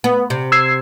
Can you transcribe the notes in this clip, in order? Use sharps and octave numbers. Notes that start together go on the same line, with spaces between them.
B3
C3
E6 G#6 C7